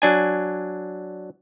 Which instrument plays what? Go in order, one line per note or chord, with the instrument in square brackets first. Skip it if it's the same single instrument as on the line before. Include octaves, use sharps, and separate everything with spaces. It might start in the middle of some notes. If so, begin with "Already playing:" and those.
[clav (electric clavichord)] F#3 D4 G#5